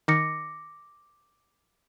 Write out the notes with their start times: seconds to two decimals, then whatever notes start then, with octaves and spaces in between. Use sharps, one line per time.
0.08 D#3 D6 A#6 C#7